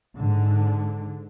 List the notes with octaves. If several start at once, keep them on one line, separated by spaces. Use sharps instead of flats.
G#2 D3